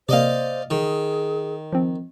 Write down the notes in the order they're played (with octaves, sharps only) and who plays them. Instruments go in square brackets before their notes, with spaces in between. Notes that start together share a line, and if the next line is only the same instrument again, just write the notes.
[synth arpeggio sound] C3 A#3 [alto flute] C5 [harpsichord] D5 D#5 F5
[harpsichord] D#3 [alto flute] G#4
[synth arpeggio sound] F3 C4